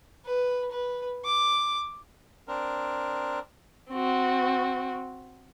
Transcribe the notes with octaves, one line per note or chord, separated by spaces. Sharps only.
B4
B4
D6
C4 D4 A#4
C4 F#4